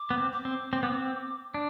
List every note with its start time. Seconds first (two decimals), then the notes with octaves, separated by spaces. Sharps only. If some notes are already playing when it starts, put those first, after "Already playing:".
Already playing: D6
0.10 B3
0.18 C4
0.32 D6
0.45 C4
0.73 C4
0.83 B3
0.92 C4
1.54 D4